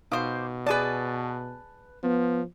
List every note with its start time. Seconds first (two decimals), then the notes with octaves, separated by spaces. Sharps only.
0.12 B2 D#4 C5 F5 D6 D#6
0.67 G#4 B4 D5 G#5 A5
2.03 F3 B3